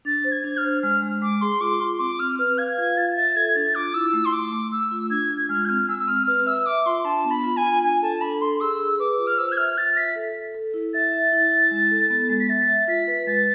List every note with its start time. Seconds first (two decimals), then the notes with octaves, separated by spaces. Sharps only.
0.05 D4 A6
0.24 C5
0.32 G#6
0.44 D4
0.57 F6
0.64 C5
0.83 G#3 F6
1.02 G#3
1.22 G#3 D6
1.41 G#4 C6
1.61 F4 D6
1.80 F4 C6
1.99 C4 D6
2.19 C4 F6
2.39 B4 F6
2.58 F5 G#6
2.77 F4 G#6
2.97 F4 A6
3.16 E5 A6
3.36 A4 G#6
3.55 D4 A6
3.75 F4 D6
3.94 E4 E6
4.13 A3
4.25 C6
4.33 A3 D6
4.52 A3
4.71 A3 E6
4.91 F4
5.10 D4 G#6
5.31 F4
5.49 G#3 F6
5.65 G#6
5.69 C4 F6
5.89 G#3 E6
5.99 E6
6.08 C4 F6
6.27 B4 F6
6.46 E5 E6
6.66 E5 D6
6.86 F4 C6
7.05 D4 A5
7.25 B3
7.31 B5
7.43 F4
7.57 G#5
7.63 F4
7.83 D4 G#5
8.02 A4 A5
8.21 D4 B5
8.41 A4 C6
8.60 G#4 E6
8.80 G#4
8.99 B4 D6
9.19 F4
9.27 F6
9.38 C5 E6
9.52 G#6
9.57 E5 F6
9.77 F4 A6
9.96 E5 B6
10.16 A4
10.35 A4
10.55 A4
10.74 E4
10.94 E5 A6
11.13 E5
11.33 E4
11.52 E4
11.71 G#3
11.91 A4
12.10 B3
12.29 G#3
12.40 B6
12.49 E5 A6
12.68 E5
12.88 F4 B6
13.08 B4
13.27 G#3 A6